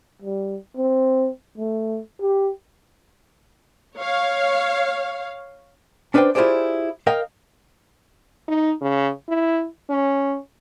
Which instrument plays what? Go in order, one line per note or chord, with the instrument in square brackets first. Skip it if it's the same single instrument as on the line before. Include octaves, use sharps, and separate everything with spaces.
[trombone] G3
C4
A3
G4
[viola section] C#5 F5
[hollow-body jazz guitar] C#4 D4 B4 C5 D5 G5
E4 F4 G4 G#4 C5 D5
A#4 D#5 F5 G5
[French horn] D#4
C#3
E4
C#4